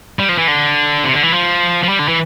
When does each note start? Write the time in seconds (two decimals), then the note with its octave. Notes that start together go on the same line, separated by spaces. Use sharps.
0.19 G3
0.29 F3
0.38 E3
0.48 D3
1.04 C3
1.14 D3
1.23 E3
1.33 F3
1.83 F3
1.89 G3
1.99 D3
2.08 E3